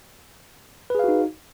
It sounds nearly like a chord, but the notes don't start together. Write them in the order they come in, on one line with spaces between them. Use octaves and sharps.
B4 G#4 F5 F#4 D#4